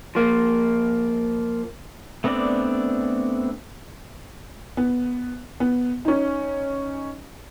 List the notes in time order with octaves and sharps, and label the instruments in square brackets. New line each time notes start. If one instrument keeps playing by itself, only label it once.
[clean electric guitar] F3 A#3
[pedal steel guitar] A3 B3 C4 D4 D5
[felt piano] B3
B3
C#4 D#4